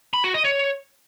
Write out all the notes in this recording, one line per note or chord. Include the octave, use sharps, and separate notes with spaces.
B5
F#4
D#5
C#5